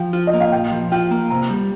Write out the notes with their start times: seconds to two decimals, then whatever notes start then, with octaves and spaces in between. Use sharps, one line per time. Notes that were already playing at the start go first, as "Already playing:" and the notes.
Already playing: F3 G5
0.13 F4
0.27 D#5
0.33 A#3
0.40 F5
0.52 A#2 G5
0.72 F3
0.92 F4 G5
1.11 A#3
1.30 C3 A#5
1.50 G3